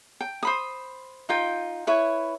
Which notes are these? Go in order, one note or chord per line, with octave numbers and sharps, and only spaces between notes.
G5
C5 B5 D#6
D#4 F4 G5
E4 B4 C#5